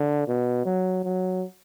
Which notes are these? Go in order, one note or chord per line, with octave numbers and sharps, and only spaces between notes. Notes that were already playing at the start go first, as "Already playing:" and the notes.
Already playing: D3
B2
F#3
F#3